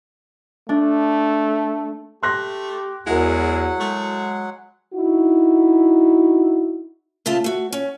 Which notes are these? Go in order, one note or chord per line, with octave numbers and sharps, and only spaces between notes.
A3 D4
A3 G4 C6 F#6 A#6
E2 F#3 G#3 E4 F#4 A#4 F#5
G#3 A3
D#4 E4 F#4
C#3 A3 F4 A5
A3 F#4
C#4